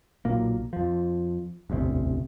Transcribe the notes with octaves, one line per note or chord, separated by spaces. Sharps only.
B1 A#2 A#3
F2 F3
E1 A1 D2 C3